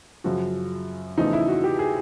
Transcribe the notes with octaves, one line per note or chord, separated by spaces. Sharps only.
F#2 C#3 F3 F#4
E2 C#3 F3 A3 D#4
E4
F#4
G4
G#4